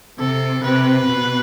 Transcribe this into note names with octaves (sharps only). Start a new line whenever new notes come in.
C3 A4
C3 B4
B2